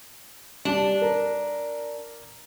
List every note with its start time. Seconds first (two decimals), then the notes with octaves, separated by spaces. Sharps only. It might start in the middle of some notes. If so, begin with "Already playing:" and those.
0.65 G3 D4 A5
1.02 A#4 A#5